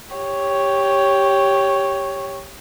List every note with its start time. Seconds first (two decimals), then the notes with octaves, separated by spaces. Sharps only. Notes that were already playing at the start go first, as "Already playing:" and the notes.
0.15 G4 C#5